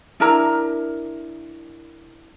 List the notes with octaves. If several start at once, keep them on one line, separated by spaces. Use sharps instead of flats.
D4 E4 A#4 A#5